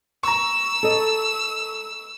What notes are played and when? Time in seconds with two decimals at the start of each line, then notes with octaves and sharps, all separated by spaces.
0.23 A#5 C#6 E6
0.83 A4 D#5